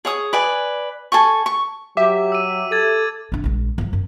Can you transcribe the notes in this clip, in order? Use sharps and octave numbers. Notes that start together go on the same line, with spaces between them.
G#4 C#5 D#6
B4 D5 G#5
A4 G#5 C#6
C#6
F#3 G4 E5 D6
E6 D#7
A4 G#6 A6 D#7
C4 D4
A#1 G#3
F3 F#3
F#2